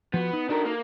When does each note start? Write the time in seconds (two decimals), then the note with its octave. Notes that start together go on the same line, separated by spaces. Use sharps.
0.14 F3 B3 F#4
0.33 D#4
0.49 D4 D#4 F#4 A4 A#4
0.65 A#3